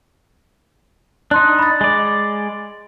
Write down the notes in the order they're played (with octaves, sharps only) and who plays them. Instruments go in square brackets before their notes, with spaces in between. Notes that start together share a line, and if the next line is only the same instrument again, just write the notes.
[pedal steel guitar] D4 D#4 [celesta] C6 F#6
[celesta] B5 A6
[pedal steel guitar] G#3 D5